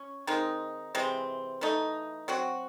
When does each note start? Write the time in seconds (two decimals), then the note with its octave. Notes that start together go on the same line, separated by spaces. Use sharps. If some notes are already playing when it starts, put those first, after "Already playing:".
Already playing: C#4
0.27 D#3 G#3 C4 D#4
0.95 C3 E3 G#3 C4
1.61 E3 A3 D#4
2.28 F#3 C4 F#4